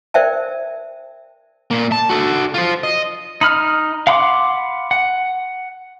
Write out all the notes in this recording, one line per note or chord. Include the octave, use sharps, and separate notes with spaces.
A#4 C5 D5 E5 G5 A5
A#2 A#3
A5
F#4 A4
F4 C5
D#5
D#4 B5 F6
F5 F#5 B5 C6 D6
F#5